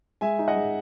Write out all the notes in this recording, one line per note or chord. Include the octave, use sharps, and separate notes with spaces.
G#3 E5 G#5
D#4
D#5 F#5
G#3